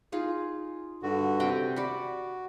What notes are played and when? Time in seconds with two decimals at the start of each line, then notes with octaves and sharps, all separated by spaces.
0.12 D#4 F4 G#4
1.03 G2 D3 F#4
1.40 C3 F#5 G5
1.76 F#4 D5 F#5 B5